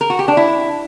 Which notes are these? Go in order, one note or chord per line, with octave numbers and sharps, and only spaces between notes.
A#4
F#4
G4
D4
E4